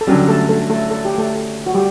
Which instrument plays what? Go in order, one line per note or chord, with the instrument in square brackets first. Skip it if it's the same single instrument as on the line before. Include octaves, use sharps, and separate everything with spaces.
[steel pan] A4
[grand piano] D3 F#3 C#4 [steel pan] G3 G4
[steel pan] A3 A4
A3 A4
A3 A4
A4
G4
A3 A4
F#4
G3 G4